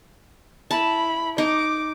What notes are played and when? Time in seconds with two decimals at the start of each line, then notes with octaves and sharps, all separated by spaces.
0.71 E4 A5 B5
1.38 D#4 D6